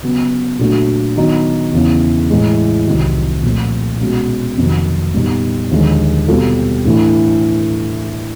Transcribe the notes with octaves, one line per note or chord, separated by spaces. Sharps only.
C#3 F#3 B3
A#2 F#3 A3 D4 F#4
D#3 F#3 B3 D#4
E2 C#3 E3
A2 E3 G#3
C2 C3 D#3 F#3
A#2 F3 A3 C4
B2 G#3 C#4 F#4
F2 C3 D#3 F#3 A#3
A#2 G3 B3 D#4
D#2 D3 F3 G#3
B2 G3 C4 F4 A4
A2 E3 A3 D4